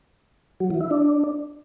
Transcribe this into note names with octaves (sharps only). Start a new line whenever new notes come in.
F#3
E3
E4
D4